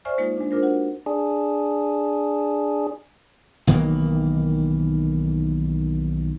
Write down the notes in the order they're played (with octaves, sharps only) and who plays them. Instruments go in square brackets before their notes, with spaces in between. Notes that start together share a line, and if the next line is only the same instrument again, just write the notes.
[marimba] C5 D5 E5 G#5 C#6 F6
G#3 A#3 D#4 F4
G#3 D4
D4 F4 A#4 C5
F#4 F#5
[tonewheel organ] D4 G#4
[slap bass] B1 D#3 E3 A#3